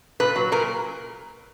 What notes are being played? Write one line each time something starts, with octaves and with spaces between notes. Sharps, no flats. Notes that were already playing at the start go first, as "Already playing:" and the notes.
A#2 B4
F#3
A#2 A#4